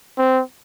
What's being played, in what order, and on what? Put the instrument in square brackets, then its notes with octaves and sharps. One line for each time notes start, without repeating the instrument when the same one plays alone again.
[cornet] C4